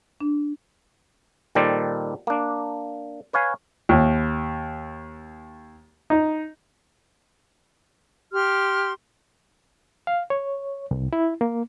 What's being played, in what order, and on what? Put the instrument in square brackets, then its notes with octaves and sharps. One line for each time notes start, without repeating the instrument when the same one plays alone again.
[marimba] D4
[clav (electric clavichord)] A#2 D#3 G3 A4 C5 D5
A#3 D4
B4 C#5 F5 G#5
[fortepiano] D#2
D#4
[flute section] G4 C6 F6
[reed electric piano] F5
C#5
C2
E4
A#3